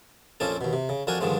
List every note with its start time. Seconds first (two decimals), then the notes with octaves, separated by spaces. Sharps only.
0.40 A#1 F2 F3 A#3 C#4 A4
0.61 D#2 B2
0.73 C3
0.89 C#3
1.07 F2 D4 F#4 A#4 G#5
1.21 G2 D3 D#3 F3 G#3